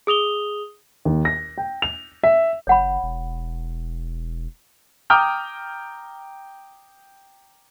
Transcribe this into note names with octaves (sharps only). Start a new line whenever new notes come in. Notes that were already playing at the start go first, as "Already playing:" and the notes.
G#4 D#6 F7 G7
D#2
A#6
G5
F7
E5
F#1 C#5 F#5 B5
E1
G5 A#5 D6 D#6 F6 G6